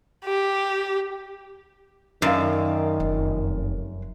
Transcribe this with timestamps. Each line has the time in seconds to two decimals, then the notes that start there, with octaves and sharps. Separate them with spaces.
0.25 G4
2.22 F#2 D#3 D5 F5
3.00 F1 C4